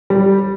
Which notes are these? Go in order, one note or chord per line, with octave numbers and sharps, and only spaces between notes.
G3